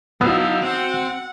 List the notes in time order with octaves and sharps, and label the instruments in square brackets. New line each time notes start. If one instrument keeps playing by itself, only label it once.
[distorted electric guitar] F#3 F5 [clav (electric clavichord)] B3 [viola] D#4 E4 [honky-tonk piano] F#4 E6
[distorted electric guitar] C4 [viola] F#5